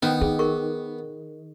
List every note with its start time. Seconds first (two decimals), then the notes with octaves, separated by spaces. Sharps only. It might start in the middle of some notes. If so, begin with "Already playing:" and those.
0.03 D#3 B3
0.21 D#4 G#4
0.39 G#4 A#4 C#6